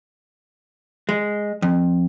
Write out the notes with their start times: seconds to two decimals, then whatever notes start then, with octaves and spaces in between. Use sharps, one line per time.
1.09 G#3
1.62 F2